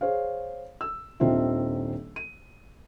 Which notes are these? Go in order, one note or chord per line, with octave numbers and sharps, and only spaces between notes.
G#4 C5 C#5 F5
E6
D#1 D#3 C4 D4 F4 E5
D#7